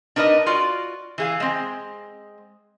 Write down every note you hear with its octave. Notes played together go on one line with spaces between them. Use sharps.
D4 D#4 A#4 B4 D#5
F4 F#4 D5
E3 G#4 F5
G#3 C4